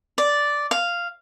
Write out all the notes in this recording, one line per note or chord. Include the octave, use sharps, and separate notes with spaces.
D5
F5